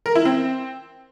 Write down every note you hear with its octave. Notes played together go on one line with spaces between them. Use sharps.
A#4
E4
C4